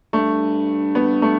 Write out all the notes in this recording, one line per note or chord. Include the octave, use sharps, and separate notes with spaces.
G2 A3
B3
A3